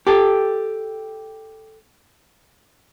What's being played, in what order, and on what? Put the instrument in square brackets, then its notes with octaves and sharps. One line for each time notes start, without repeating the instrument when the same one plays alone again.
[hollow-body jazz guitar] G4 A4